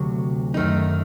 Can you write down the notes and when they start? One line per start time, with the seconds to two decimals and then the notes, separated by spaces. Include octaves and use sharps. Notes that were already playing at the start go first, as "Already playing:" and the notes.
Already playing: D2 C3 F#3
0.54 F#2 D#3 A3 D#4